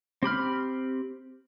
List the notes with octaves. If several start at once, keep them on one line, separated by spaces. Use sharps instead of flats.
C4 G4 B5 F6